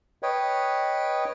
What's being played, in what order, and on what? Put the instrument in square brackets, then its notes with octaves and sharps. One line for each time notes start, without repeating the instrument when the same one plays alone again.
[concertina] B4 C#5 D#5 G5